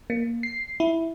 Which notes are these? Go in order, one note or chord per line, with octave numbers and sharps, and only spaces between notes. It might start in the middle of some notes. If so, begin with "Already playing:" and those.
A#3
C7
E4